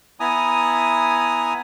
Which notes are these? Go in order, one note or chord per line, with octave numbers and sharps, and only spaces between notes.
B3 E4 G#5 A#5 D#6